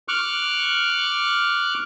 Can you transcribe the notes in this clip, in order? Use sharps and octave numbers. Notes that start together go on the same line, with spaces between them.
C#6 D6 F6 F#6